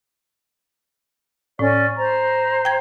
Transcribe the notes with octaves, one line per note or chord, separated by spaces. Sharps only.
A2 C#4 D5
C5 A#5
G5 G#6